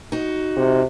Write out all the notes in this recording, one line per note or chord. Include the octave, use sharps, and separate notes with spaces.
D#4 F#4
C3